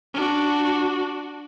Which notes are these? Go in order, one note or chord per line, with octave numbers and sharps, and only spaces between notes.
D4 F#4